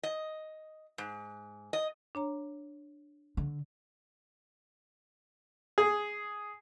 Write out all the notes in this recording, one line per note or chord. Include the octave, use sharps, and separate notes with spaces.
D#5
G#2
D#5
D4 C#5 A#5
D3
G#4